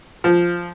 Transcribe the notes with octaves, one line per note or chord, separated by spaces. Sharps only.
F3